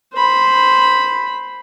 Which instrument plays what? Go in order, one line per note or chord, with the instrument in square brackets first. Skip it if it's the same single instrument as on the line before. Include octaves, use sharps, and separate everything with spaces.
[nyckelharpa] C5 B5